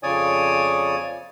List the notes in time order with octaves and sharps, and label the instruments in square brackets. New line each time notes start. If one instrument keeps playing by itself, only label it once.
[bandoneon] F2 C#3 C#5 D5 G#5 D#6